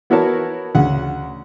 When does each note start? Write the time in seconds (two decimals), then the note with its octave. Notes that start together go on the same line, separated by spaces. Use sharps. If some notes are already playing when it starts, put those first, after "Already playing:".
0.10 B3 E4 F#4 A#4 C#5 A5
0.75 D2 C#3 F#5